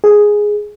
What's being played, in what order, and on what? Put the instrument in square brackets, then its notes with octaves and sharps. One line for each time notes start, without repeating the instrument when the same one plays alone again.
[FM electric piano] G#4